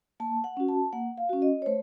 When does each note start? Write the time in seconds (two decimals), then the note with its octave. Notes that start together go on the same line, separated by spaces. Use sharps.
0.20 A#3 A5
0.44 F#5
0.57 C#4 F#4
0.69 A5
0.93 A#3 F#5
1.18 F5
1.29 C#4 F#4
1.42 D#5
1.62 C#5
1.66 A3 C5